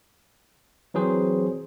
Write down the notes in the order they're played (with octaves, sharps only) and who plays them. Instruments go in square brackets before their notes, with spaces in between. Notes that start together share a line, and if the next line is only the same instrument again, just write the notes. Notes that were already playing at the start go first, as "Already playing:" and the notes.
[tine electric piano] E3 F#3 C4 G#4 C5